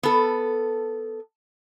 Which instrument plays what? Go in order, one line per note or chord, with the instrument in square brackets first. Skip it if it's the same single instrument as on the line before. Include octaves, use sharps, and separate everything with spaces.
[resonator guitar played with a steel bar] B3 A4